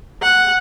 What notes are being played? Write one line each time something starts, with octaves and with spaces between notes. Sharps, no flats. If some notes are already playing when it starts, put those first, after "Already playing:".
F#5